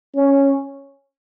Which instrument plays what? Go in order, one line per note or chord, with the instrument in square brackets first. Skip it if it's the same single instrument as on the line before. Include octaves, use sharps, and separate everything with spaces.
[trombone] C#4